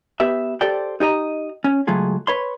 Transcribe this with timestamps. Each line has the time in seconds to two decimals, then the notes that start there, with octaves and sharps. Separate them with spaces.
0.20 B3 G4 B4 E5
0.61 G4 A4 C5 D5 G5
1.00 D#4 G4 D#5 A#5
1.64 C#4
1.87 C#2 F#3 A3 F4 G#4
2.27 B4 C#5 C6